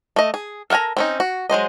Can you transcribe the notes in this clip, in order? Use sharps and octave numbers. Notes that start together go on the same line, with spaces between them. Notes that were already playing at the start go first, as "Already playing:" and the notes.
A3 D#5
G#4
A4 A#4 F#5 G#5 A#5
C4 C#4 D#4
F#4
F#3 G#3 C5 D#5